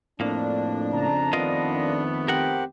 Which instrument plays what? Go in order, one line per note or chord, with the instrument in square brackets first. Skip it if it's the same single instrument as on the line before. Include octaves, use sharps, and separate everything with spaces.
[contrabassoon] F2 [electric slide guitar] A2 A#3 [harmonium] D4
[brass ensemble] C#3 A5 A#5
[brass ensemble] D#3 A3 B3 [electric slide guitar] F4 A#4 D#5
[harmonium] C4 G4 [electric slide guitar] A#4 F#5